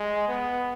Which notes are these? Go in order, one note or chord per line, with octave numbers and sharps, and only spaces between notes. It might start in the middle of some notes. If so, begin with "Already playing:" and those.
Already playing: G#3
B3